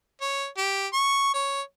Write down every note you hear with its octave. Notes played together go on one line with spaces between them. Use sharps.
C#5
G4
C#6
C#5